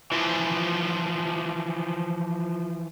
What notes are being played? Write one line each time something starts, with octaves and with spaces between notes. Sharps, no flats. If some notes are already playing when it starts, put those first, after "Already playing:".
E3 F3